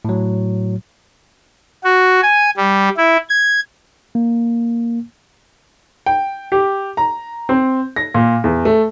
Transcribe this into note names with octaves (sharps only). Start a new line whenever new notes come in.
A2 F#3
F#4
G#5
G3
E4
G#6
A#3
G5
G4
A#5
C4
A#6
A#2
E2
A3